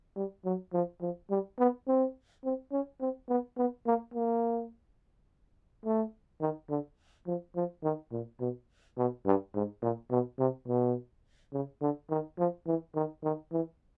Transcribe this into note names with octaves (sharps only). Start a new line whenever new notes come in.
G3
F#3
F3
F3
G3
B3
C4
C4
C#4
C4
B3
B3
A#3
A#3
A3
D#3
D3
F3
F3
D#3
A#2
B2
B2
G2
G#2
A#2
B2
C3
B2
C#3
D3
D#3
F3
E3
D#3
D#3
E3